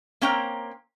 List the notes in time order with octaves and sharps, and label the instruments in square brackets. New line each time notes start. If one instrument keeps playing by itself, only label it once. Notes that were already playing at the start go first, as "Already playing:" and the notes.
[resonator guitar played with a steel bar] A#3 C4 C#4 G5 A#5